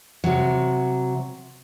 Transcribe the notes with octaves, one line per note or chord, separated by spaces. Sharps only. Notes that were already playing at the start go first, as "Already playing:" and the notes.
C3 F#3